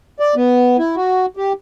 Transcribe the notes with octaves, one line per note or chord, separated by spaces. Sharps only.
D5
B3
E4
F#4
G4